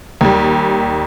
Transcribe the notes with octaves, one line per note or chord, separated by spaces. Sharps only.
D#2 G3